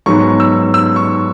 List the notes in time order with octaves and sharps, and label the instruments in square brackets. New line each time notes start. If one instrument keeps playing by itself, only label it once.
[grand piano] G#2 F#3 B3 C#6
E6
E6
C#6